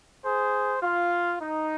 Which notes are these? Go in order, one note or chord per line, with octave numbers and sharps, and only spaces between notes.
G#4 C5
F4
D#4